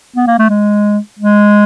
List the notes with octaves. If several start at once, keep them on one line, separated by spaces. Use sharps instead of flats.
B3
A#3
A3
G#3
G#3